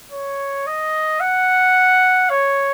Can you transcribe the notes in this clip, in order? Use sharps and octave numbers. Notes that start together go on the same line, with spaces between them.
C#5
D#5
F#5
C#5